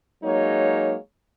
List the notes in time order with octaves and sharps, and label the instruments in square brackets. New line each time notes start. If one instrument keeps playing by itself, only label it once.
[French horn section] F#3 G#3 A#3 D#4 C#5